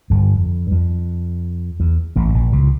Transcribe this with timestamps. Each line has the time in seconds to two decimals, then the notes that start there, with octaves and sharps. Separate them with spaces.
0.10 G1 G2
0.35 F2
0.67 G2
0.71 F2
1.80 E2
2.16 A1 A2
2.29 A2
2.34 A#1 A#2
2.52 C#2 C#3